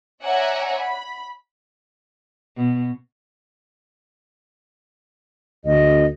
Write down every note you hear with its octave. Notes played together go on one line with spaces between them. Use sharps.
C#5 D5 E5 F#5 G#5 A#5
B5
B2
D2 D#5